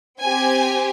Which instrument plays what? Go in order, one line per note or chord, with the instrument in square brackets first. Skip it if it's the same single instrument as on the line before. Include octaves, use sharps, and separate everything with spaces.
[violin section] C4 G4 G#5